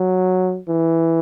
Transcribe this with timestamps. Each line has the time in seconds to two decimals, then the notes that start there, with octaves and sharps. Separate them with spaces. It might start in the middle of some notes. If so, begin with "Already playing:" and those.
Already playing: F#3
0.69 E3